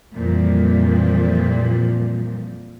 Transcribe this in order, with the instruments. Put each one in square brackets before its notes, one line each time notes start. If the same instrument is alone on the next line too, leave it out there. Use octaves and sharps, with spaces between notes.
[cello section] F2 A#2 E3 F3 G3